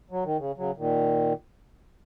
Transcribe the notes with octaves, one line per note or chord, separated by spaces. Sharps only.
F#3
D#3
C#3
C#3 F#3
A#2 D#3